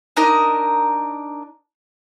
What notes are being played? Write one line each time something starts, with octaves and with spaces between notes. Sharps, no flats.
D4 D#4 A#4 D#5